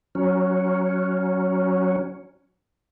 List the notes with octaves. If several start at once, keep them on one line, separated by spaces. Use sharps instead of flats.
F#3 C#4